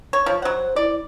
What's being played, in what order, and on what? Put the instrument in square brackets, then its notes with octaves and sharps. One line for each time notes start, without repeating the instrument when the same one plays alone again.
[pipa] C#5
[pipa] F3 [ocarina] C#5
[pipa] F#3 F#5 [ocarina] C5
[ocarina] E4 [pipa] D5